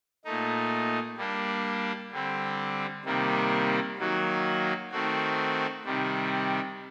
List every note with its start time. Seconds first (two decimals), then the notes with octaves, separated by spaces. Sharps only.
0.25 A#2 A3 D#4
1.17 G3 A#3 D4
2.12 D3 G3 C4
3.05 C3 D#3 G3 A#3
3.98 D#3 F#3 A#3 F#4
4.91 D#3 A3 C4 F#4
5.85 C3 D#3 G3